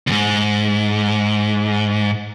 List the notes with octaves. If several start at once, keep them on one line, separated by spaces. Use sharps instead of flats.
D#2 G#2